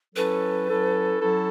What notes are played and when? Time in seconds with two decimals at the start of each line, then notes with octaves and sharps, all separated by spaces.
0.15 F#3 C#4 E4 A4 B4
0.68 F#3 C#4 E4 A4
1.20 F#3 C#4 E4 A4